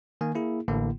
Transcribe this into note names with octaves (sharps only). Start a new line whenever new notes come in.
D#3 A#3 G#5
A#3 E4 G#4
A1 A2 D3 A#3 E4